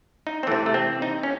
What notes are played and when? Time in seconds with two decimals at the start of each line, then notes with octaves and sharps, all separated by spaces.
0.27 D#4
0.43 C4
0.47 C3 E3 A3
0.66 A3
0.74 C4
1.02 D#4
1.23 C#4